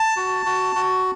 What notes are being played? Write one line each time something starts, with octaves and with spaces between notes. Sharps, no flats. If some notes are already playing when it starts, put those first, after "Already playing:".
Already playing: A5
F#4
F#4
F#4